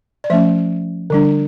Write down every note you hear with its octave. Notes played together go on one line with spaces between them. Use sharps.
D5
F3 A3 C#4 E5
D3 G3 D4